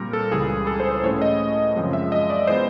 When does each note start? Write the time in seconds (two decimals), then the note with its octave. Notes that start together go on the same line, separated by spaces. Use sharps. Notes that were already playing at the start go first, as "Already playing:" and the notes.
Already playing: A#2 G3 C4 A#4
0.13 A4
0.31 C#2 C#3 E3 G3 G#4
0.67 A4
0.80 C5
0.92 C5
1.03 A2 E3 A3 C#4 C#5
1.22 D#5
1.76 F#2 C#3 F3 G#3 C4
1.93 E5
2.12 D#5
2.30 D5
2.47 E3 G#3 B3 C5